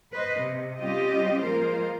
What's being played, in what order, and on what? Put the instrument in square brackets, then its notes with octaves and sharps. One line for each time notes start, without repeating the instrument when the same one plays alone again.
[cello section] B4 C5 D#5
C3
G3 C4 C#4 F4 G4 D#5
F3 G#3 A#3 F4 A#4 C5